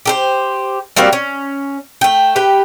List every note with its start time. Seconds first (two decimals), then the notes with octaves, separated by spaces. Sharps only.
0.05 G4 A4 C5
0.96 G3 A#3 C4 F#4
1.13 C#4
2.01 A3 G5
2.36 G4 B4 G5